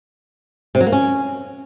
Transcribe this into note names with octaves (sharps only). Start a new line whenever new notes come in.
C3
F#3
A#3
C#4